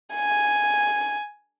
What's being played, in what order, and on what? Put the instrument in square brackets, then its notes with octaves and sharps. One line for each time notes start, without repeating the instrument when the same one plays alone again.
[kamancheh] G#5